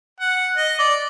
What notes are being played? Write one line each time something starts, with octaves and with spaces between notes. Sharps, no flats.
F#5
D#5
D5